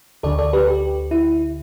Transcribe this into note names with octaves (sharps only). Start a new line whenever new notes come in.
D2 D3 A4 D5
A4 D5
G4 B4
G4
E4